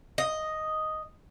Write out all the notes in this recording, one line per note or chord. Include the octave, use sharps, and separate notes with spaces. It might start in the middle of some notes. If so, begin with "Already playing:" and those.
D#5